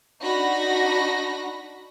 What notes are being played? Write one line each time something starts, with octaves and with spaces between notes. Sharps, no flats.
D4 D#4 F#4 B5 A#6